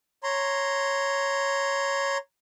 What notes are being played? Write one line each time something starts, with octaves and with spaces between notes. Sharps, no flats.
C#5 A#5 C6